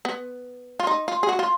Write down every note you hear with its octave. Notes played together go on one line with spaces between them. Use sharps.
B3
F4
D#4
F4
G#4
F#4
F4